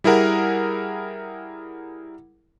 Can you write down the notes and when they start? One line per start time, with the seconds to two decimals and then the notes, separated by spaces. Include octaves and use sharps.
0.04 G3 E4 G#4 A#4 F#5